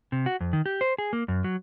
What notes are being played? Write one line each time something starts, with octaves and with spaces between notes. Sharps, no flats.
C3
F#4
F2
D#3
G4
C5
G#4
A#3
F#2
F#3